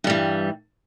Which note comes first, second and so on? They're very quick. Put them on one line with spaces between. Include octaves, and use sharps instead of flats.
G2 G3 E3